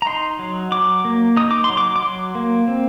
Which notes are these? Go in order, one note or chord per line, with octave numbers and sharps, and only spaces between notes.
A#5
D#4 C6
F#3
F#3 D6
A#3
D#4 D#6
D6
C6
F#3
D6
D6
F#3 C6
A#3
C4